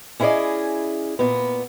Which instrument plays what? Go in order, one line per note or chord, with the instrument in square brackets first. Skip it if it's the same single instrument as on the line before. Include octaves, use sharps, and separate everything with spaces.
[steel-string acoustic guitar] C#4 E4 G#4 B4 D5 D#5
A#2 B3